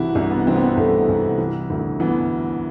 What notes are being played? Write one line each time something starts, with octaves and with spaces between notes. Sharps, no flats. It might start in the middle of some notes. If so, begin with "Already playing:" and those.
Already playing: C2 C3 E3 E4 F#4
C2 D4
B3
E3 C4
B3
C4
C2 A3
C2
E3
D2
E3 B3